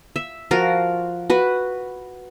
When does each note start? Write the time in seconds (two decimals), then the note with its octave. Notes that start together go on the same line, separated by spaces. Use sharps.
0.16 E5
0.51 F3 F4 F#4 A#4
1.30 F#4 B4